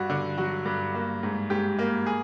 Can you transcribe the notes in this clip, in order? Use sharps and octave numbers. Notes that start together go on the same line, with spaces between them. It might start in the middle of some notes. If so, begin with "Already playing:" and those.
Already playing: G2 F#4
D3
F#3 F#4
G2
A#3
G#2
G#2 G4
A#3
G#4